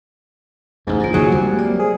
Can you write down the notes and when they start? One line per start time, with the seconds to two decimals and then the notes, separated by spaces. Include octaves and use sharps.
0.87 A1 E2 G#2
1.00 F#2 A#3 D#4 F4
1.14 F#1 D#2 A#2 F#3 G#4
1.32 C3 G3 G#3 A#3 G#5
1.59 A#3 D5
1.80 G#4